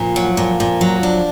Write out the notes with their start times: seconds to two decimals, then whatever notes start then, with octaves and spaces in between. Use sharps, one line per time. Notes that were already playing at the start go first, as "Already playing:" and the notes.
Already playing: A#2 F3
0.16 F#3
0.37 A#2
0.60 A#2
0.81 F#3
1.03 D4